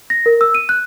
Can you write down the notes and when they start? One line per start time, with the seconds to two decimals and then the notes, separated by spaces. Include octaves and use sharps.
0.10 A#6
0.26 A#4
0.41 E6
0.55 D#7
0.69 F#6